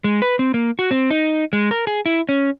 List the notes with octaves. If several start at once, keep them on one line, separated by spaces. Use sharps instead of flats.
G#3
B4
C4
A#3
F#4
C4
D#4
G#3
A#4
G#4
E4
C#4